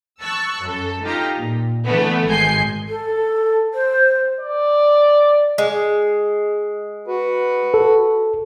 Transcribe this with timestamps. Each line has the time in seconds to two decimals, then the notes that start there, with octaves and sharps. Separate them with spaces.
0.22 A5 C#6 E6 F#6
0.63 F#2 A4
1.03 D#4 F4 G4 A#5
1.36 A#2
1.85 D3 E3 A3 B3
2.28 G#1 G#3 G#5 G6 C7
2.88 A4
3.74 C5
4.41 D5
5.58 G#3
7.08 F#4 B4
7.74 A4